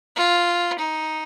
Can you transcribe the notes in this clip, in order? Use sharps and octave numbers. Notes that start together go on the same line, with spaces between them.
F4
D#4